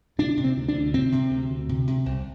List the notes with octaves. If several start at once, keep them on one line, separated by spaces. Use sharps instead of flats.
C3 D4
C3
C4
D2
D4
D2
C3 C4
C3
D2
D2
C3
C3
C2